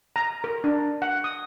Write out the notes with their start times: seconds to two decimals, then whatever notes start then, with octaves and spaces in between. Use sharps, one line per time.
0.16 A#5
0.44 A#4
0.64 D4
1.02 F#5
1.24 D#6